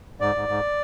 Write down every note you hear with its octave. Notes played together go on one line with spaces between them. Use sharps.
G#2 D5
G#2
G#2